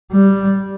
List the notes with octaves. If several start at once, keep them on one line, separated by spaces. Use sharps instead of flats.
G3